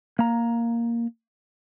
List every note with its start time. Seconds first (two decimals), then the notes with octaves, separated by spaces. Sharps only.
0.19 A#3 A#5